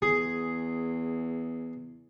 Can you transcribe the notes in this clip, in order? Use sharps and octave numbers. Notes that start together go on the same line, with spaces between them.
E2 G#4